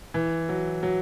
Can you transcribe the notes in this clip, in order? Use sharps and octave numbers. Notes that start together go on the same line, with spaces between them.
E3
F#3
F#3